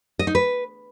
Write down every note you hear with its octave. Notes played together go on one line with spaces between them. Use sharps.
D#5
D#4
B4